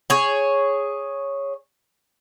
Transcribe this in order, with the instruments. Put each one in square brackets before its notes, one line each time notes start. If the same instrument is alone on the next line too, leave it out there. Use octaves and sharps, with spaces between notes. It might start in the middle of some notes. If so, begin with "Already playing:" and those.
[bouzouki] G#4 C#5